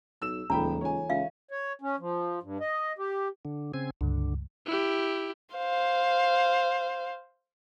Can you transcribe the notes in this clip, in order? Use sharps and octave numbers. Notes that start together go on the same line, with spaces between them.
B1 E6 E7
D#1 C#2 E3 D#4 A4 G5 A#5 B5
C#2 F4 C#5 G#5
C#2 E5 F5
C#5
C#4
F3
G2
D#5
G4
D3
C#3 C4 G#5
C#2 G2 D3
E4 G4
C5 F5